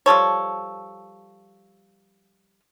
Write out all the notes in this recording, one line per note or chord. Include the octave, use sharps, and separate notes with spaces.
F3 G3 A4 C#5